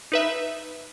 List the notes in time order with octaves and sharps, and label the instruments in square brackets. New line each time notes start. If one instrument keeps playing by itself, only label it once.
[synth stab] D#4 B4 E5